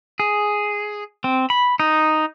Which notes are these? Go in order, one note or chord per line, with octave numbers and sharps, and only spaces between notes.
G#4
C4
B5
D#4